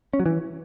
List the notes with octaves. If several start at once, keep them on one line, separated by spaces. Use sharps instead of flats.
C#4
F#3
E3